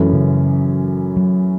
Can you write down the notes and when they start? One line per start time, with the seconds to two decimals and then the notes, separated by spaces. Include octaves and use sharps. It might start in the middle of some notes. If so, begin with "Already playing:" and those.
Already playing: F#2 E3 A3 C#4
0.13 C#3
1.17 F#3